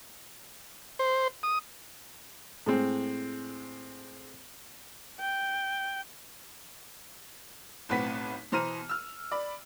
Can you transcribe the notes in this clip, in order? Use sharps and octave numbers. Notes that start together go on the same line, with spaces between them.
C5
D#6
A2 G#3 C4
G5
B1 A2 C4 B4 F#5 B6
B2 E3 C5 A#5 F6 D#7
E6 F6
D5 B5